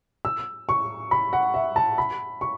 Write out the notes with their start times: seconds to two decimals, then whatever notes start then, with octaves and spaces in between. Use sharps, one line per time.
0.25 E6
0.69 C#6
1.11 B5
1.33 F#5
1.54 E5
1.76 A5
1.98 B5
2.41 C#6